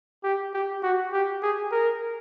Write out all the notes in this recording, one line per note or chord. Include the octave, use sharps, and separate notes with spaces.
G4
G4
F#4
G4
G#4
A#4